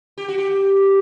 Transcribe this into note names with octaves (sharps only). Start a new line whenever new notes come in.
G4
F#4
G4